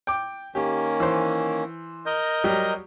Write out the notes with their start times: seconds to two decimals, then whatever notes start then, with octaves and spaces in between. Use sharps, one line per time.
0.07 G5 D6
0.55 D#3 A#3 C#4 G4
1.00 E3 C5
2.06 A#4 D#5 G6
2.44 F#3 G3 G4